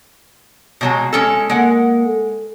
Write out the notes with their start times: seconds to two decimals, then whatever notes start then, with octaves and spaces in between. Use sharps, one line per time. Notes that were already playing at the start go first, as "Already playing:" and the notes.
0.81 B2 F#3 G#3
1.13 G#3 C#4 A4
1.50 G#3 A#3 F#5
2.06 A4